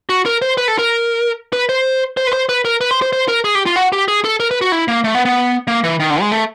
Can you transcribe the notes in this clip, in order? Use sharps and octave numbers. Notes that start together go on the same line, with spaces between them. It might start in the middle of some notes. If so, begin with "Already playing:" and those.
F#4
A#4
C5
B4
A4
A#4
B4
C5
C5
B4
C5
B4
A#4
B4
C5
C5
C5
A#4
G#4
G4
F4
F#4
G4
G#4
A4
A#4
B4
F#4
E4
A#3
A3
B3
B3
A#3
E3
D#3
D3
G#3
A3